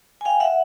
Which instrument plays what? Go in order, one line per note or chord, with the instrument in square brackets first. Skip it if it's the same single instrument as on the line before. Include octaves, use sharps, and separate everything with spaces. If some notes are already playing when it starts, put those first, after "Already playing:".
[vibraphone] G#5
F5 G5
E5 F#5